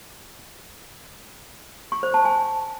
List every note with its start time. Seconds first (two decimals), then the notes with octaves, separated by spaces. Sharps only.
1.92 C#6
2.03 C5
2.14 A5
2.25 G#5